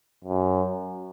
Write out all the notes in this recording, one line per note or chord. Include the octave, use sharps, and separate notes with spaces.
F#2